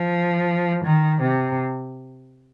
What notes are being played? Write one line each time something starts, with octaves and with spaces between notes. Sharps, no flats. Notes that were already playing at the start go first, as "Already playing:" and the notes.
Already playing: F3
D#3
C3